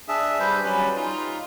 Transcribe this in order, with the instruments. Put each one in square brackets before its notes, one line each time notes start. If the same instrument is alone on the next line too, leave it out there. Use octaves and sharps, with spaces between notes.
[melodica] D4 G#4 E5
G3 B4 C5
F#3 G3 C#4 B4
D#4 F4